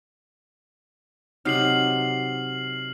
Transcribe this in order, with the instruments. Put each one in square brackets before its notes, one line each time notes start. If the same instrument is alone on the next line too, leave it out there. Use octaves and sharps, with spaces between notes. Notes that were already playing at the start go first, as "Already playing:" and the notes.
[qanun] C3 F#3 D#4 [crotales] F6 C7 F#7